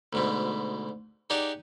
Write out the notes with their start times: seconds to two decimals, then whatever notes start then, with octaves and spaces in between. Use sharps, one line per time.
0.13 D2 G#2 B2
1.30 D#4 G4 G#4 D5 F#5